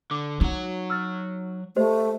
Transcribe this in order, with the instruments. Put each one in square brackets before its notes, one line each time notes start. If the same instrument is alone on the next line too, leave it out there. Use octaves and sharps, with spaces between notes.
[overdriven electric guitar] D3 [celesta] D6
[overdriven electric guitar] F#3 F#4 [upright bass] D#4
[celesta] E6 F6 A6
[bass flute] A3 [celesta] G4 C5 D#5